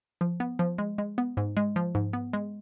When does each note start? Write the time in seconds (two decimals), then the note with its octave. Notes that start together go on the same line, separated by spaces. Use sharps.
0.21 F3
0.40 B3
0.59 F3
0.78 G#3
0.98 G#3
1.18 B3
1.37 G#2
1.57 G#3
1.76 F3
1.95 G#2
2.13 B3
2.33 G#3